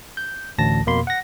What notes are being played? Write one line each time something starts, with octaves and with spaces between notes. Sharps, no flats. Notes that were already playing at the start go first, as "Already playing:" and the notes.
G6
A1 D2 A5 A#6
F2 B2 A#3 B5 C6
F#5 A#6